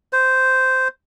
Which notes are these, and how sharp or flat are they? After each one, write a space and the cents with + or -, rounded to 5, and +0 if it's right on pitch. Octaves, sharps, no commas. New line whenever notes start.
C5 -10